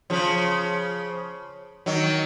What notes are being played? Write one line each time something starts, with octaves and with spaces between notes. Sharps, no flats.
C#3 F3
D#3 F#3